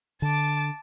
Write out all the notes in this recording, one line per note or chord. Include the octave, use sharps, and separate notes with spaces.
D3 A5 D6